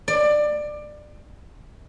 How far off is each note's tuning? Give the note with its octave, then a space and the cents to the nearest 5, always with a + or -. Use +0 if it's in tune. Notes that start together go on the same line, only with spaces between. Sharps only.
D5 +20